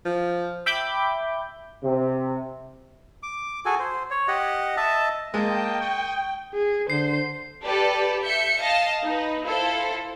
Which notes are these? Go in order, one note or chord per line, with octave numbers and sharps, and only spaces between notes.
F3
E5 G5 B5 D6 G6
C3
D6
F#4 G#4 A4 G#5
C5
C#5
G4 D#5 F#5
D#5 E5 A5
G#3 A#3 D#5 G5 A5
C#6 D#6
G#4
D3 C5 C7
G4 A4 B4 D5
E5 G6 C#7
D#5 F5 A5
D#4 B4
E4 F4 A4 C5